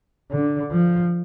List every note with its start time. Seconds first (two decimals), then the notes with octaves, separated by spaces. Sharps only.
0.31 D3
0.72 F3